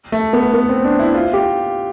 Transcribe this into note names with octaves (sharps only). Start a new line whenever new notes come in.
A3
B3
B3
C4
D4
E4
F4
G4